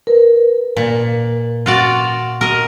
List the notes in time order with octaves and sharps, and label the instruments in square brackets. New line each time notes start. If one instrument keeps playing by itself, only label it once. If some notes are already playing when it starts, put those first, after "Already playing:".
[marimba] A#4 B4
[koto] A#2
F4 F#4 D5
A#4 D#5